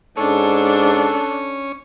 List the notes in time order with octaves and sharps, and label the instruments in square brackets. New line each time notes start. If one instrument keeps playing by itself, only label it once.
[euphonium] G#2 [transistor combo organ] C#4 C#5 [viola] D4 [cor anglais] A4